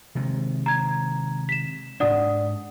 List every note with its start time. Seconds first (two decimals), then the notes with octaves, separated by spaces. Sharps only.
0.15 C3 D#3 G#3
0.66 A#5 G#6
1.49 B6 E7
2.00 G#2 D4 D5 F#5 D#6